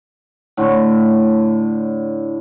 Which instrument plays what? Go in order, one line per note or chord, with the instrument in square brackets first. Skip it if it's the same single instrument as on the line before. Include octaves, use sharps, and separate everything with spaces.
[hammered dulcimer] A2 D3